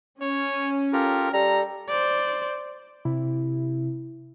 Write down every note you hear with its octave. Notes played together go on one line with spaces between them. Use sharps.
C#4 C#5
F4 G4 A4 A#4
G3 A4 A#5
C5 D5
C3 E4